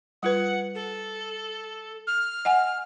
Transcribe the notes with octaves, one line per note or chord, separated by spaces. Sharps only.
G3 F4 B4 F#5
A4
F6
D#5 F#5 G#5